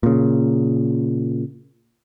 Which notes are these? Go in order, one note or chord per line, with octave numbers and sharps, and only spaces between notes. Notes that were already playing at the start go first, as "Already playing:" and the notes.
A#2 C#3